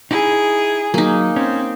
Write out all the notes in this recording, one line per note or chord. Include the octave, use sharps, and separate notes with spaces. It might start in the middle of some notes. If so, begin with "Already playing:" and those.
D#4 E4 G#4
F#3 A#3 D#4
C4 C#4